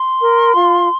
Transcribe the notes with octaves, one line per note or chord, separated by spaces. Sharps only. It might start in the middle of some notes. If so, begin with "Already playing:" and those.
Already playing: C6
A#4
F4